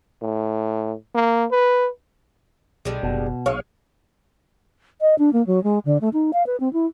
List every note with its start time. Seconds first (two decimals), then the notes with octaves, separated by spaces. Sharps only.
0.22 A2
1.15 A#3
1.51 B4
2.85 B1 D3 G3 G#3
3.03 F#1 B2
3.46 B1 G#3 C#5 F5
5.01 D#5
5.19 D4
5.33 A#3
5.47 F#3
5.64 G#3
5.85 D3
6.01 A3
6.13 D#4
6.33 F5
6.46 B4
6.60 C4
6.73 E4